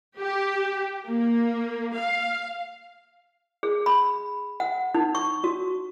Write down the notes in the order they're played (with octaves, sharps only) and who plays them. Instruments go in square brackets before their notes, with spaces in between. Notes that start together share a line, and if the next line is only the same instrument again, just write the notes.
[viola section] G4
A#3
F5
[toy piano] G#4
B5
F#5
D#4
C#6
F#4